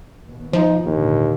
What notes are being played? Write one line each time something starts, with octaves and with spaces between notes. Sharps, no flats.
D#2 B2
F3 D#4
G#1 D#2 A#2 D3